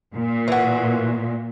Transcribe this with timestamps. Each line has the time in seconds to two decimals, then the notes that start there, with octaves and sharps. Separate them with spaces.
0.14 A#2
0.48 E3 F#4